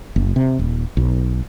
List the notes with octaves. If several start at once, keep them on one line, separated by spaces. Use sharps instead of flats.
F#1
C3
D#1
B1